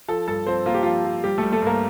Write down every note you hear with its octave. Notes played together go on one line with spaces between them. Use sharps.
F3 A4 A5
G2 A4 A5
F3 C4 C5
A#3 F4
G4
F3 F4
F3
G3 G4
G3 A3 A4
A3 A4
G2 A#3 A#4